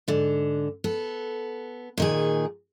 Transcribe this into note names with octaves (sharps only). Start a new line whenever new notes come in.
G#2 D3
B3 A4
A#2 D#3 G#4